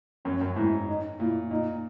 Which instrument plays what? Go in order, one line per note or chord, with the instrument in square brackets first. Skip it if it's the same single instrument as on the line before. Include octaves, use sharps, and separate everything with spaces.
[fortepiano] F#2 [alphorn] C#4
[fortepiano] F#2
[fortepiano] G#2 [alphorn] E4
[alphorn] D#4
[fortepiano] A#2 [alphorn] E4
[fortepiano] A#2 [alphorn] D#4